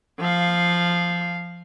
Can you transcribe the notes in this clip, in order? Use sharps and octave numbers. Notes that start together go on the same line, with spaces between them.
F3 F5